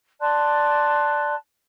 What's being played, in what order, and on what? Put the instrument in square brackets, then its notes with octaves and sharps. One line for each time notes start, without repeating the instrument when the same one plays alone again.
[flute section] D5 A5 C6 F#6